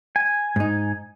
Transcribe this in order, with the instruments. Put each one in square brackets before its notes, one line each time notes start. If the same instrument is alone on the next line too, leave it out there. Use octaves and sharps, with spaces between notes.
[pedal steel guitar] G#5
[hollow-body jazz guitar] G#2 D#4